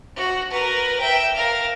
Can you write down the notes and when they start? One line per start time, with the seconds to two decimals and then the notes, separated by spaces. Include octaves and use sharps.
0.16 F#4
0.50 A#4 B4
1.00 E5 G5
1.34 A#4 F5